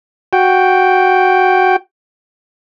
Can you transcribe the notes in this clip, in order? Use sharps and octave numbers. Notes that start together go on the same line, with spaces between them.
F#4 G5